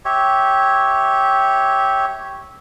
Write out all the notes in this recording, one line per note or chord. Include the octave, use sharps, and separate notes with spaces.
G4 C#5 E5